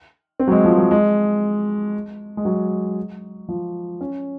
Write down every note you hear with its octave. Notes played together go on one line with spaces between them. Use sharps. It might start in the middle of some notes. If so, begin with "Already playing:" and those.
C4
F#3
G#3
F3
G#3
F#3
G#3
G#3
F#3
F3
C#4